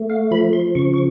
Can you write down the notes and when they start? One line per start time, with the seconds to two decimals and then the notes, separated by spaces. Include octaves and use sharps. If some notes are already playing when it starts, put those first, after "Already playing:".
Already playing: A3
0.10 F5
0.31 F3 B5
0.53 C6
0.75 C#3 C#6
0.94 C#6